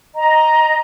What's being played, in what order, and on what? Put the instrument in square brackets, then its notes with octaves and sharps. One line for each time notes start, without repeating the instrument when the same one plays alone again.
[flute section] D#5 A#5